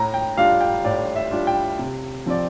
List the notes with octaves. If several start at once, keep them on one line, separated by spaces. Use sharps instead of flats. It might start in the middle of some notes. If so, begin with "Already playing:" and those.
Already playing: A2 A#5
G5
G3 D4 F4 F5
G5
A2 D5
E5
G3 D4 F4
G5
C3
F3 C4 D5